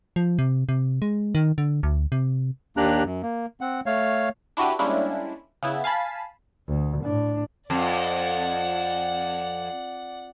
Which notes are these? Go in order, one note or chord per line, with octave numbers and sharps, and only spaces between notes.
F3
C3
C3
G#3
D#3
D3
D2
C3
D#2 A#3 D4 G4 A#5 F#6
F#2
A#3
C4 F#5
A3 C#5 F5
D4 E4 F#4 G4 B4
G3 G#3 A#3 C#4 D4 E4
C#3 B3 E4
F5 G#5 A5 B5
D2
A2 D4
F2 D5 F#5